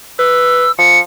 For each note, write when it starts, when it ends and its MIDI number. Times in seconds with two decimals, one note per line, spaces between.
0.19 0.66 71
0.19 0.72 88
0.78 1.00 53
0.78 0.99 97